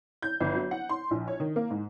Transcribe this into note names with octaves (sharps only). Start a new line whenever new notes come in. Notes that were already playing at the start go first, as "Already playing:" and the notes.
G6
G1
F#3
F#5
C6
A#1
C#5
D#3
A#3
G#2